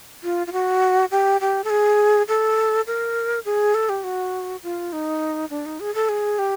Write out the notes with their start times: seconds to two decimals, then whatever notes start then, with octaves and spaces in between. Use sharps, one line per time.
0.23 F4
0.47 F4
0.53 F#4
1.11 G4
1.41 G4
1.64 A4
1.70 G#4
2.28 A4
2.87 A#4
3.45 G#4
3.75 A4
3.89 G4
4.04 F#4
4.63 F4
4.93 D#4
5.50 D4
5.66 D#4
5.80 G#4
5.95 A4
6.09 G#4
6.39 G4